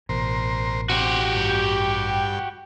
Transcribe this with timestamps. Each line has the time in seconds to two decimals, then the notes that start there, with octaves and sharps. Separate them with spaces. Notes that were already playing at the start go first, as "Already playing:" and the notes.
0.09 A1 B2 A#4 C5
0.90 C4 F#4 G4
1.36 G2 G5